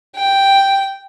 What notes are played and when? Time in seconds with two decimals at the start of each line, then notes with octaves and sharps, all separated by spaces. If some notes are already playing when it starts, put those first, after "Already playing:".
0.16 G5